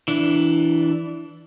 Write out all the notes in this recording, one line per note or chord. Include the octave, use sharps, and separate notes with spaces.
E3 D4